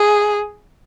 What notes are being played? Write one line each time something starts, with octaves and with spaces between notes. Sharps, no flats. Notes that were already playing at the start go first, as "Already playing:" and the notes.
Already playing: G#4